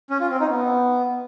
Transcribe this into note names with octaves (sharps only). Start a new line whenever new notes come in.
C#4
F4
C4
D#4
B3